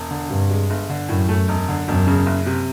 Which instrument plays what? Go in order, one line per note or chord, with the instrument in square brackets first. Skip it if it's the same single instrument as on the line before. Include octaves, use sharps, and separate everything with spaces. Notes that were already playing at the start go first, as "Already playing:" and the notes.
Already playing: [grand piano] E1
D3
[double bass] G2 [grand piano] C3
[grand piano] G#3
G1
D3
[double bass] F#2 [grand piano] A2
[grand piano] A3
E1
D3
[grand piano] E1 [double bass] F#2
[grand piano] C#3
F#1
C3